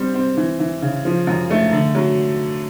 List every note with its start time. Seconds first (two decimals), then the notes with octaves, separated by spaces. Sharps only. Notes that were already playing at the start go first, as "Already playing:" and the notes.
Already playing: G3 C4
0.14 C4
0.37 E3
0.59 E3
0.82 C#3
1.05 F3
1.27 F#2
1.50 A3
1.72 D3
1.95 F#3